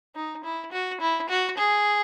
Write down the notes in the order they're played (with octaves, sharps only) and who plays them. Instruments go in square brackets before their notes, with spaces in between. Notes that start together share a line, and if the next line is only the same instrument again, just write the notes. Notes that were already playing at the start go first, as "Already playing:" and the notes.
[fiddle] D#4
E4
F#4
E4
F#4
G#4